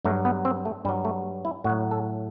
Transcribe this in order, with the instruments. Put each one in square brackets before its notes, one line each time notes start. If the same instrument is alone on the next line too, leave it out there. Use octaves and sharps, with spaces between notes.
[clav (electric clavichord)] G2 F#3 A3
B3
C4
A3
G2 G3
F#3
A3
E4
A2 F#4
F#3
A4